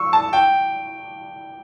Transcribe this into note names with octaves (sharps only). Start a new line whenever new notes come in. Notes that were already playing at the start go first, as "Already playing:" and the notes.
Already playing: C#6 E6
A5
G5